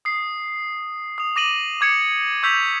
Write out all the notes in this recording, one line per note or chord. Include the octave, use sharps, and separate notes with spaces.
D#6 C7
D#6 F7
D6 A#6 D#7 F#7
D6 G#6 C#7
C#6 E6 G6 B6 F7 F#7